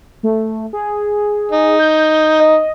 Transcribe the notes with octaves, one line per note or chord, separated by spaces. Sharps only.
A3
G#4
D#4
G6
D#5